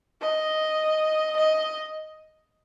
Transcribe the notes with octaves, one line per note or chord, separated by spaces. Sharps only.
D#5
D#5